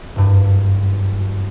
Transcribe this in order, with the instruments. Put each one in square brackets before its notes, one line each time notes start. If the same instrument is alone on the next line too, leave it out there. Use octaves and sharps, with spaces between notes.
[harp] F#1 G2 D#7